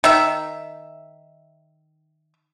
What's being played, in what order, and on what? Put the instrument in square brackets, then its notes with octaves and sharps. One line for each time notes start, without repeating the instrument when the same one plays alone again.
[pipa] D#3 E5